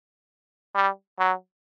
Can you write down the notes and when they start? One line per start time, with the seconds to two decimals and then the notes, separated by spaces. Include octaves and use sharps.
0.75 G3
1.19 F#3